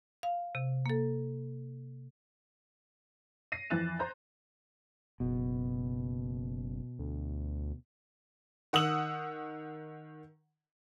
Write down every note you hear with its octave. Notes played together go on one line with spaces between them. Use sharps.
F5
C3
A#3 A4
A#6 C7 D#7
F2 E3 F#6 A6 E7
C5 A#5 G6
F#1 B2
D2
D#3 F#5 D#6 E6 F#7